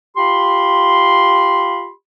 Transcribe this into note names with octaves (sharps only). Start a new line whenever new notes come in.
F4 G4 B5 C6